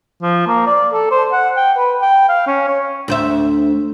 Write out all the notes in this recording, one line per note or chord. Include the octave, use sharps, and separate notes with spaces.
F3
A#3
D5
A4
C5
F#5
G5
B4
G5
F5
C#4
C#5
D2 C5 E5